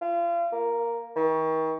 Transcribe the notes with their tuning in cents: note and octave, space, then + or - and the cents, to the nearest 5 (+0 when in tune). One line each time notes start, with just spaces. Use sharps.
F4 -35
A#3 +0
D#3 +40